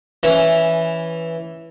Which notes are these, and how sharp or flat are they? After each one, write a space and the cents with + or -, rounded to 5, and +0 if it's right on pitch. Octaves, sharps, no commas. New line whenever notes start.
E3 +0 C#4 +0